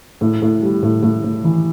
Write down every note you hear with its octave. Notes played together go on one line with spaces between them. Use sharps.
A2
A2
G3
A2
A2
A2
E3